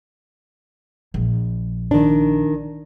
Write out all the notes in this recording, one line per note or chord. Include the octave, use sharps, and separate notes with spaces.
A#1
D#3 D4